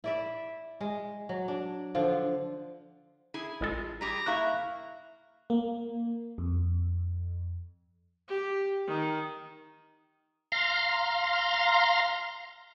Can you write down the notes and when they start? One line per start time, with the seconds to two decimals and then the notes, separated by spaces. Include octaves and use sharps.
0.04 E4 D5 E5
0.81 G#3
1.29 F#3
1.48 D4
1.95 D3 F3 F4
3.34 E4 G#4
3.61 A1 G#3 F4 A4
4.01 G3 G4 G#4 A#5
4.26 A#3 E4 E5 F5 C#6 F#6
5.50 A#3
6.38 F2
8.28 G4
8.87 D#3
10.52 F5 A#5 C6